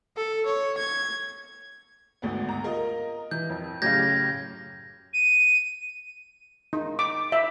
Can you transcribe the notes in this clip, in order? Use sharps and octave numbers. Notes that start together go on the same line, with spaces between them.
A4
C#5
G#6
G#1 D2 B3
A#5
F4 A#4 D#5
E3 G6
F2
F#2 A2 C#3 G4 F5 G6 G#6 A#6
D#7
D#4
D6
E5